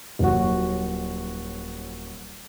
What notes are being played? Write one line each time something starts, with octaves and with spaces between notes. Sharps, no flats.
D#1 F#3 F#4